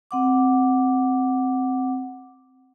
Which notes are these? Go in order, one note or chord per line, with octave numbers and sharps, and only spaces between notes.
C4 F#5 D6